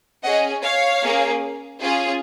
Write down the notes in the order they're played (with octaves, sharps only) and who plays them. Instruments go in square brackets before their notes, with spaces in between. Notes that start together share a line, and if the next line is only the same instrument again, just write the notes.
[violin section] C#4 G#4 D#5 F#5
C#5 F5
A#3 C#4 G#4
C#4 F4 G#4